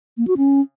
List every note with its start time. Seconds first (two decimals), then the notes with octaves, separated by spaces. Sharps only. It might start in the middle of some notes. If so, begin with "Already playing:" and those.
0.18 A#3
0.27 F#4
0.37 C#4